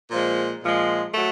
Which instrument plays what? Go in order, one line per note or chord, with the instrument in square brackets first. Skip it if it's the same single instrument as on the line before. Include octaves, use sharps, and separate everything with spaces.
[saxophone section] A#2 F3 G#3
A#2 F3 G#3
F#3 A3